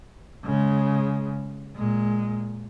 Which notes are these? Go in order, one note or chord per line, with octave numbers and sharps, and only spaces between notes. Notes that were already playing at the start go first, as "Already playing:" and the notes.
C#3 G#3
A#2 G#3